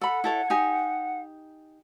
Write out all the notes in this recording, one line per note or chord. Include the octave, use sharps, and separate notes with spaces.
A4 F#5 B5
E4 A4 C#5
D#4 G4 G#5